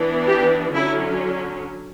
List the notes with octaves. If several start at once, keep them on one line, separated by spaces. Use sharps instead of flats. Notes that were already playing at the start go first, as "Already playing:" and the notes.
Already playing: E3 B3 D4
G4
D3 F#3 C#4 E4